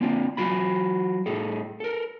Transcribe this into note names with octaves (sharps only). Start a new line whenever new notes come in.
A#3 C4 D4 F4
F#3 F4 F#4 B5
A2 G#4 A4
A4 A#4